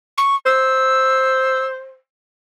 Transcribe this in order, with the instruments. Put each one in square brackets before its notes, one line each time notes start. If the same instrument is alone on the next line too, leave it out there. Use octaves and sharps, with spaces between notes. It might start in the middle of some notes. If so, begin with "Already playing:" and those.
[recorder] C#6
[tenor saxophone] C5 [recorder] E6